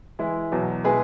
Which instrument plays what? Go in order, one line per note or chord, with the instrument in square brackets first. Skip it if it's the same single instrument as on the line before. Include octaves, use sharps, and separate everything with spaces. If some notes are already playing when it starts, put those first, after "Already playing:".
[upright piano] E3 G#3 E4
E2 B2 F#3
B2 G#3 E4 G#4 B4